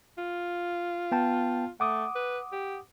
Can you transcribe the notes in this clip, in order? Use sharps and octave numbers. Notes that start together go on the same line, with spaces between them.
F4
B3 G5 A5
A3 F#5 D6 D#6
B4
G4